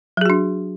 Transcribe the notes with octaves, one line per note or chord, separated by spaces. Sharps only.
F#3 D4 F#4 G#4